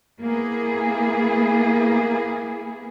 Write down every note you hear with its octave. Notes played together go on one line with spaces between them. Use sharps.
A#3 B3 E4 G#4